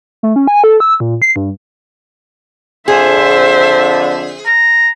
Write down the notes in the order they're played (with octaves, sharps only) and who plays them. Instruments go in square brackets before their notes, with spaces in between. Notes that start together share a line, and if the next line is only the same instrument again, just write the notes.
[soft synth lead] A3
C#4
G#5
A4
E6
A#2
C7
G2
[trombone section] F2 D3 [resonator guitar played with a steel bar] G#4 [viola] C5 E5
[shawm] A#5